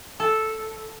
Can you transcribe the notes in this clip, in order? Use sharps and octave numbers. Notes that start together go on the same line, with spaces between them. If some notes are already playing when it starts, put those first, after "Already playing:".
A4